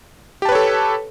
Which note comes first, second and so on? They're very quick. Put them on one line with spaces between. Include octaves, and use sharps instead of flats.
G4 A5 B4 C#5 A4